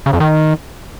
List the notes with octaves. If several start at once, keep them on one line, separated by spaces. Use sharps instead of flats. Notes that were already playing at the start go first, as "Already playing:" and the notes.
C#3
F2
D#3